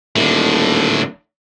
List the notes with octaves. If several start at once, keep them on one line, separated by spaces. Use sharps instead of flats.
D#1 A2 D3